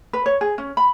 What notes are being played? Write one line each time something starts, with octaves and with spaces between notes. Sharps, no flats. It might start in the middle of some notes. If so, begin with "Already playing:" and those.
B4
C#5
G#4
C#4
B5